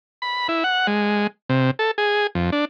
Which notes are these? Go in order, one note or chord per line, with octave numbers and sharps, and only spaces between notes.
B5
E4
F#5
G#3
C3
A4
G#4
F2
D4